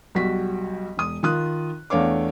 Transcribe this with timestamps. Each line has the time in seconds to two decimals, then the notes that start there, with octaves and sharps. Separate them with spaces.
0.15 B1 G3 F#4 B6
0.97 E1 D#6
1.23 D#3 F4 D#6 F#6
1.90 E2 A3 D4 C#5 F5 D6